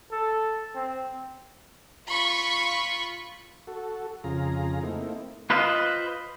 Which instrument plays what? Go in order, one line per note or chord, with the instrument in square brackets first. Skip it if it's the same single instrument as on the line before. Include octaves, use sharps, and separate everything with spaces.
[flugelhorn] A4
C4
[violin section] F4 B5 C#6
[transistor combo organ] F#4 A4
F2 C#3 F4 G#4 A#5
A3 A#3 C4 D#4 E4
[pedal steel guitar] F4 B4 C5 D#5 F5